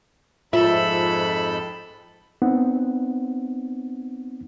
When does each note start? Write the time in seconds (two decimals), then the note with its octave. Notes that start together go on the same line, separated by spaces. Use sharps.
0.53 F2 G#2 F4 A4 E5 B5
2.42 B3 C4 D#4 F#5